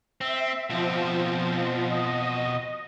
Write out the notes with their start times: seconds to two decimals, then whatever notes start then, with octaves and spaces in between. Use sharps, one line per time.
0.21 C4 E5
0.70 B2 F3 C4
1.90 D#5